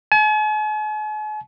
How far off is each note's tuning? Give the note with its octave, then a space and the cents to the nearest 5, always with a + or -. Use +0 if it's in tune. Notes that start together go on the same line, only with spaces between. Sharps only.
G#5 +45